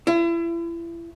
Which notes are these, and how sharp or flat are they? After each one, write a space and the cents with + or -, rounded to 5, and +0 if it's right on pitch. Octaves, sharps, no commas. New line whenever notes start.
E4 +35